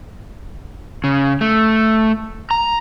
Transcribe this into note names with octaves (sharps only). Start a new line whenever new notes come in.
C#3
A3
A#5